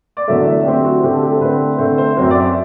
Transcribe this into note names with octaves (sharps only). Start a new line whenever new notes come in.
D5
E2 D3 F#3 A3 E5
E5
D3 A3 C4 G4
F#4
D3 A3 C4 G4
A4
G4
A4
D3 A3 C4 B4
D3 A3 C4 C5
C5
F#2 F#3 C4
D5
E5